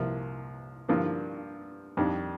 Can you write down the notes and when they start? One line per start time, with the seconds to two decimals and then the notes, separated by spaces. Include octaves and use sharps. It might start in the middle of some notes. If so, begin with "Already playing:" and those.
Already playing: C2 C3 F3 A#3
0.88 G2 D3 F3 A#3 D4
1.97 F2 D#3 G3 D4